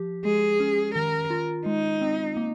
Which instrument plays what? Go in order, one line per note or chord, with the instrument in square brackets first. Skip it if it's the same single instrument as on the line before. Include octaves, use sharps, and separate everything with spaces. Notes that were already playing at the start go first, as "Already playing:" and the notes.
Already playing: [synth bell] F3 G4
[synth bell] G#3 [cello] G#4
[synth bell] C#4
[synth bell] D#3 [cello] A#4
[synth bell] F4
[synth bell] G#3 [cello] D#4
[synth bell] C4
A#3